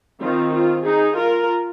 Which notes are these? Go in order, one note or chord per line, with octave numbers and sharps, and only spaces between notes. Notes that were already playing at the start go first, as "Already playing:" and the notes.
D#3 C4 F4
F4
D#4 G#4
F4 A#4